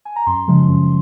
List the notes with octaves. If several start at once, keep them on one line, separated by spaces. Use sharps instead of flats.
G#5
A#5
F#2 C6
C#3 F3 G#3
F#2